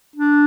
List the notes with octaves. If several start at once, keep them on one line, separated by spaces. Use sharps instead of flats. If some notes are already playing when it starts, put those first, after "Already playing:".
D4